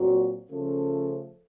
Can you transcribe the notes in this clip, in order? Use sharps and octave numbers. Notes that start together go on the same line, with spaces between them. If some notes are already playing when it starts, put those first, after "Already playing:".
Already playing: A#2 F#3 C4 F#4
C#3 F3 A3 C#4 A4